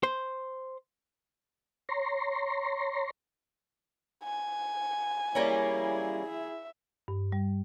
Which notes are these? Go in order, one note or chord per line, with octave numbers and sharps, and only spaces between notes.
C5
C#5 A#5 C6
G#5
G3 A#3 C#4 E4 G#4
E5
G2
G3